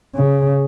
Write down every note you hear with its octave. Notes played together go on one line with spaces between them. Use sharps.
C#3